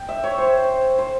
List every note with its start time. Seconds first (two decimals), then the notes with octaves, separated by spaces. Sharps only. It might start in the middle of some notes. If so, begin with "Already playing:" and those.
Already playing: G5
0.09 E5
0.24 C#5
0.38 C5
0.98 C5